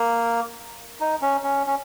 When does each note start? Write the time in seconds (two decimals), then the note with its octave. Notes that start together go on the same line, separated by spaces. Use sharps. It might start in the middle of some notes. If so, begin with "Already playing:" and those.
Already playing: A#3
1.00 D#4
1.22 C#4
1.43 C#4
1.67 C#4